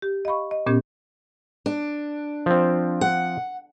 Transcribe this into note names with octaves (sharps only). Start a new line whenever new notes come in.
G4
D#5 F5 B5 C#6
D#5
A#2 B3 C#4 G4 G#6
D4
F3 C4
F#5